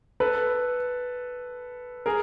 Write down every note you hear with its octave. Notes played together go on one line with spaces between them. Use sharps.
A4 B4
G#4 A#4